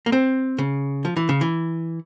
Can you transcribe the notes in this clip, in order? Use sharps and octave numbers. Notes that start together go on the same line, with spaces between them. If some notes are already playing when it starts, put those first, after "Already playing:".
A#3
C4
C#3
F3
E3
C#3
E3